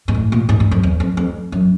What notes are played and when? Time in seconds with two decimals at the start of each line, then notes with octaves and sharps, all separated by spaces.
0.08 G#2
0.15 A2
0.32 A#2
0.49 G#2
0.60 G2
0.71 F2
0.83 E2
1.00 F2
1.17 F2
1.52 F#2